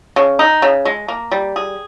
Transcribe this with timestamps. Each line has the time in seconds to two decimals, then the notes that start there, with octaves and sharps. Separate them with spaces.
0.16 C#3
0.39 D#4
0.62 C#3
0.85 G#3
1.08 A#3
1.31 G3
1.56 G#4